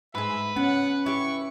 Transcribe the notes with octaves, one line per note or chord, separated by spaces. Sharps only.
G#2 G#4 B4 E5
B3 C#4 F#5
E4 G4 C#6